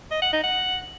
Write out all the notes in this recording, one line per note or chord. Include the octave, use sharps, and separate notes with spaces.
D#5
F#5
D#4
F#5